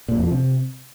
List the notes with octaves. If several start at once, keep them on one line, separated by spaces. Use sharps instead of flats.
A#2
F2
F3
C3